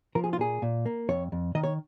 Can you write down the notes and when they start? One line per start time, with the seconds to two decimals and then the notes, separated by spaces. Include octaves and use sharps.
0.15 F3 A#4
0.24 G#4
0.33 F4
0.39 A#2 G#4
0.62 A#2
0.86 A#3
1.09 F2 C#5
1.32 F2
1.55 D#3 D#5
1.64 C#5